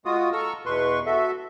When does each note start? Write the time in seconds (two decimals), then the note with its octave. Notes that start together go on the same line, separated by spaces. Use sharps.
0.05 G#3 F4 F#4 D#6
0.33 A4 A#5 C#6 E6 F6
0.66 E2 B2 B4 C6 C#6
1.06 F#4 A4 E5